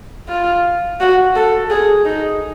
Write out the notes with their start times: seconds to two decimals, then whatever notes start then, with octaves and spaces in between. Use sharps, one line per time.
0.29 F4
1.00 F#4
1.36 A4
1.70 G#4
2.05 D#4